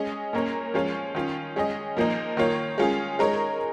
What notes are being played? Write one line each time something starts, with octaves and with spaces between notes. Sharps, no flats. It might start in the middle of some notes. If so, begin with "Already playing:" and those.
Already playing: G#3 C#4 G#4 D#5
A#2 A#3 C#4 A#4 C#5
F3 G#3 C#4 F4 C#5
D#3 C#4 F4
G#3 C#4 G#4 D#5
A#2 F3 A#3 D#4
D#3 A#3 F4 C#5
G#3 C#4 F4 G#4
G#3 D#4 A#4 C#5